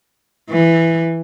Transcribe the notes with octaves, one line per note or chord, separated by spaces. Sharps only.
E3